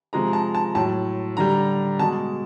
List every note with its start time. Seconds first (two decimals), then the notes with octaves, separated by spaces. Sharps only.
0.13 C3 F3 G#3 A#5
0.33 A5
0.55 A5
0.75 A2 F#3 A5
1.37 D3 G3 A#5
1.99 B2 G#3 A5